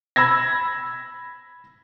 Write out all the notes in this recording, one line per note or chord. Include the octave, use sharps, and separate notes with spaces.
B5 E6 G#6 A#6